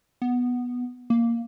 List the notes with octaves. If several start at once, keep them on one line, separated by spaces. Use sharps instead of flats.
B3
A#3